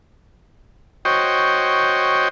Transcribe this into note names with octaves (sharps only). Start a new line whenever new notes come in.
F#4 C5 C#5 D#5 G5